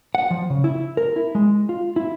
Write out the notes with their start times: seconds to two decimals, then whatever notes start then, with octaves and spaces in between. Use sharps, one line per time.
0.15 F#5
0.31 F3
0.50 C#3
0.64 E4
0.97 A#4
1.16 E4
1.35 G#3
1.69 F4
1.96 E4